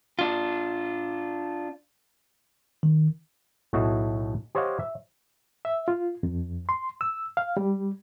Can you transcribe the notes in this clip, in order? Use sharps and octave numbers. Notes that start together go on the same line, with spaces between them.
D4 F4
D#3
B1 A2 A3 F#4 D#5
G4 C5 C#5 D#5 F5 F#5
E5
E5
F4
F2
C6
E6
F5
G3